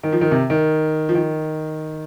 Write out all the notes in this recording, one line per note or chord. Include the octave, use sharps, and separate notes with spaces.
D#3
F3
D#3
C3
D#3
F3
D#3